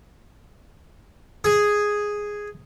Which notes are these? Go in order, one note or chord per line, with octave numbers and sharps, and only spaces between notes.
G#4